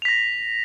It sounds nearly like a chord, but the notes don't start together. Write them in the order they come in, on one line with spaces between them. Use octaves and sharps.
F7 B6 A#6